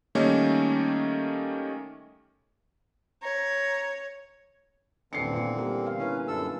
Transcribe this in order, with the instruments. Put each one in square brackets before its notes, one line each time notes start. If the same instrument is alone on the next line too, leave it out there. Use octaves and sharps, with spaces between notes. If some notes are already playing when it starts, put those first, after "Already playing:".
[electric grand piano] D#3 G3 A3 A#3 C#4 D#4
[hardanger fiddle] C#5 [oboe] A#5
[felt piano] D#1 C7 C#7 [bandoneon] D3 E3 C4 [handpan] D4
[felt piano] A#2 B3 C#7 [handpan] F4
[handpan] G3 A#3 A#4
F5
[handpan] D3 E4 B4 [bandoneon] C#4
[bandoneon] F#2 A4 E6 [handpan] D4